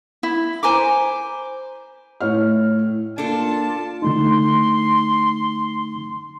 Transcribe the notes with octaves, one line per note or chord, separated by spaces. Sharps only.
E4
C5 G#5 A#5 D6
A2 C#5 F6
A#3 D4 F4 A4 A5
D3 A3 D#4 C6